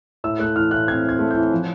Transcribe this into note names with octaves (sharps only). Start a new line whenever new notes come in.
A2 E6
A3 F#6
E3 F6
A2 F#6
C4 G#6
C4
G#6
A3
E3 G6
F3